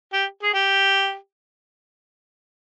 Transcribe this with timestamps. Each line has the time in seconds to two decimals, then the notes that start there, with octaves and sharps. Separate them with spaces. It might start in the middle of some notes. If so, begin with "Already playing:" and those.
0.13 G4
0.43 G#4
0.54 G4